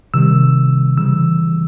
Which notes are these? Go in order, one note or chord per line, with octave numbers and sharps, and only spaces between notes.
C3 D#3 G3 E6
C#3 E3 G3 E6